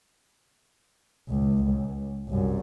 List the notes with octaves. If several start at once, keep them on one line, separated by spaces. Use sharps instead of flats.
C#2
C#2
C2 F#2